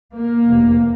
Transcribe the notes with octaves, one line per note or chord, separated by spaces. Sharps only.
A#3
F1 E2 C3